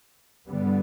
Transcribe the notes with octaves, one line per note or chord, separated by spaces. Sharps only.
G2 D3 G3 B3